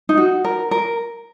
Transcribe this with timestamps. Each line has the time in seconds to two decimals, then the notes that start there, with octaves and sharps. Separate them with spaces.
0.09 D#4
0.17 F#4
0.44 A#4
0.71 A#4